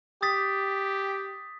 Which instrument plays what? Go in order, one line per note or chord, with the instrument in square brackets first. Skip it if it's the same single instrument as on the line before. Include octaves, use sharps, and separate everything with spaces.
[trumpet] G4 [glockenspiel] D#6 A6 B6